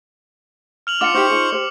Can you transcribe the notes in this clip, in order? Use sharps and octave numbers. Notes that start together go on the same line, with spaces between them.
F6 F7 F#7
D4 F4 F#5 D6 C#7
D#4 E4 G4 C5 C#6
D#4 F4 G#4
G4 C5